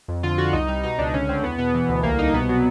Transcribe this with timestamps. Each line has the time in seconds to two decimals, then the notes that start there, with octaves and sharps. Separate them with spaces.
0.08 F2
0.23 D3 F4
0.38 D3 F#4
0.53 C2 D#4
0.68 G3 D#4
0.83 B2 D#4
0.98 C#2 D4
1.14 D3 C#4
1.28 D2 C4
1.43 E2 B3
1.58 B2 B3
1.74 E3
1.89 D2
2.03 C2 A#3
2.19 C2 D#4
2.34 B2 B3
2.49 F#3